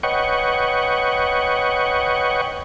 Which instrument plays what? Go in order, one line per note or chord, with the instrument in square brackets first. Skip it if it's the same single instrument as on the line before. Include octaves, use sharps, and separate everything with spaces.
[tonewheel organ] B4 C#5 D#5 F#5 G5 C#6